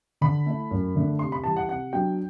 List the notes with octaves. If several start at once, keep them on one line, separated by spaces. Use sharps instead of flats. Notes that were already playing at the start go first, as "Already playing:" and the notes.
D3 B5
A3 E4
F#2
D3 A3 D4
C3 C6
B5
E3 G3 A5
F#5
C3 F#5
F#3 B3 D4 G5